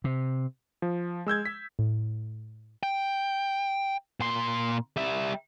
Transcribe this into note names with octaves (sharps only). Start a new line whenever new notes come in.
C3
F3
G#3 E6 G6 G#6
B6
A2
G5
A#2 C6
G3 E5